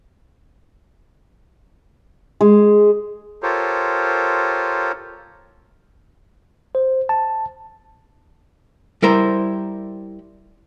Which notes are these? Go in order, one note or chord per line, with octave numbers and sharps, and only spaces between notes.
G#3
F4 G4 A4 A#4 C5 C#5
C5
A5
G3 E4 A#4 C5